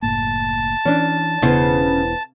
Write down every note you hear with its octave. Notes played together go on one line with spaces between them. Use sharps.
F#1 A2 A#3 A5
E3 C#4 D4
E1 C#3 B3 E4 C5